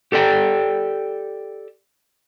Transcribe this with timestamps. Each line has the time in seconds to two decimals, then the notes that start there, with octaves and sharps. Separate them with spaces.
0.12 G4 A4 D5 G5